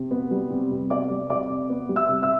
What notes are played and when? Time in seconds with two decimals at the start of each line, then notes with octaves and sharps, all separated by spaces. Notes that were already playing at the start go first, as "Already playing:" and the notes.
Already playing: C3
0.11 B3
0.31 G3
0.50 C3
0.71 C3
0.90 B3 D5 D6
1.10 G3
1.30 C3 D5 D6
1.50 C3
1.70 B3
1.89 G3
1.96 E5 E6
2.09 C3
2.22 E5 E6